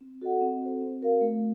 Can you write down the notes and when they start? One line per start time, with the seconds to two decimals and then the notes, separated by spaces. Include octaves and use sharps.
0.01 C4
0.22 F#4 A4 D#5 F#5
0.41 C4
0.61 F#4 A4 C5
0.81 C4
1.01 F#4 A#4 F5
1.21 A3